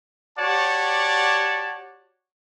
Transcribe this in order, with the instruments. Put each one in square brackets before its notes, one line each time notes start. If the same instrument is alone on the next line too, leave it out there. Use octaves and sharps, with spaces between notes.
[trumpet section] F#4 G4 C#5 D5 F#5 A5